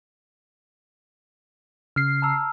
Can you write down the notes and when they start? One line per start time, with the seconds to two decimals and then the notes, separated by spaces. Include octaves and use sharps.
1.96 C#3 F6 C7
2.22 A5 A#5 E6